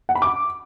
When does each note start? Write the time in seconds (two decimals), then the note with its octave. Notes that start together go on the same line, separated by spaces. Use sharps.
0.09 F#5
0.15 B5
0.22 D6